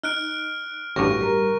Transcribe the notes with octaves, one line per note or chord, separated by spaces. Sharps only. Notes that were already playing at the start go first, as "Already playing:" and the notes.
D#4 F6 F#6 D7
A1 G2 F#4 C#6 A#6
G3 A#4 A#5